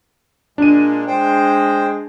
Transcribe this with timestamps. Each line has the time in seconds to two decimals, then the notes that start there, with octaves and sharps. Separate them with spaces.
0.58 A#2 G#3 D4 D#7
1.07 G#3 C5 G5